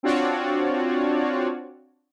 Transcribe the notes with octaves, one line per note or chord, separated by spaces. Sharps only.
C4 D4 F4 F#4 C#5 D5